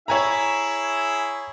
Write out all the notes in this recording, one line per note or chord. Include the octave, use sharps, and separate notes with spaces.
E4 G#4 C#5 E5 G#5 A#5